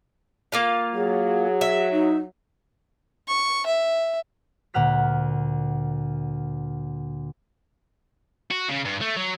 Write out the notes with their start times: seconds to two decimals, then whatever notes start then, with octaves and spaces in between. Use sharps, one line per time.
0.52 A#3 F4 F5
0.94 F#3 G#4
1.61 E5
1.91 D#4
3.28 C#6
3.66 E5
4.74 D2 A#2 F#5 F6 B6
8.51 F#4
8.68 C#3
8.85 G2
9.01 A3
9.16 F#3